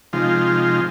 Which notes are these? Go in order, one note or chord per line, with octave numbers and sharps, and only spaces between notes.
C3 F3 G#3 D#4 F4